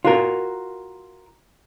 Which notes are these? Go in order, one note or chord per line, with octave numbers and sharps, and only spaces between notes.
F4 F#4 A#4